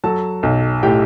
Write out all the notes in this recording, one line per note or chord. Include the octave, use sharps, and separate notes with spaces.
F#3 A4 A5
B1
A2 G4 G5